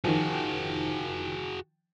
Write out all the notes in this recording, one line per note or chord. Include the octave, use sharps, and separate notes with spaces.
D#3 F3 F#4 G#4